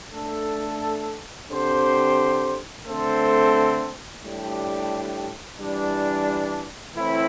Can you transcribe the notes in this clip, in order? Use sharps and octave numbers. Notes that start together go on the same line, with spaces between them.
A3 D4 A4
D3 C4 G4 C5
D3 A3 C4 A4 C5
A2 G3 D4 G4
E3 G3 D4
A2 E3 C4 E4